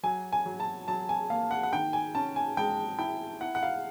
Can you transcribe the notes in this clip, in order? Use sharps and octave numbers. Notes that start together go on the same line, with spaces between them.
F#3 G#5
G#5
F#3
A5
F#3 A5
G#5
A#3 F5
F#5
F#5
D#3 G5
G#5
C#4 A5
G#5
G#3 G5
E4 G5
E4 F#5
F#5
F5